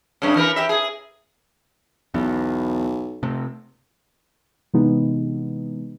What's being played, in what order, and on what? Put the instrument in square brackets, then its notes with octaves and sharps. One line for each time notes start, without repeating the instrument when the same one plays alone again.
[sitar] G2 C#3
E3 A#4 B4
G4 E5
G#4
[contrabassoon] B1 [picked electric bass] E2
[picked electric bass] C3 A3
[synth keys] C3 E3 G#3 B3 D#4